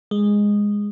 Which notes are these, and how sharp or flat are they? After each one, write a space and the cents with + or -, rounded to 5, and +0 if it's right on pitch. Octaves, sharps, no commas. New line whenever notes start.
G#3 -10